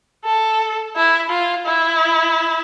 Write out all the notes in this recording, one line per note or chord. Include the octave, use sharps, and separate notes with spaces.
A4
E4
F4
E4